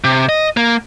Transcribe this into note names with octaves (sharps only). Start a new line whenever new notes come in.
C3
D#5
A#3